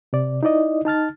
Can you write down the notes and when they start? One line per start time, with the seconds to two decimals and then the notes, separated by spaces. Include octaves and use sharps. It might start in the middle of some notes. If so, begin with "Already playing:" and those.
0.13 C3 D5
0.43 D#4 E4 D5 D#5
0.85 D#4 A5 F6 A6